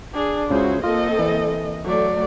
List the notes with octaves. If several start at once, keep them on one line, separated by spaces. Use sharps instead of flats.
D4 G#4
C#2 C#3 E4 F#4 G#4 C5
A#3 C4 F4 A4 D#5
E3
F#3 A3 D5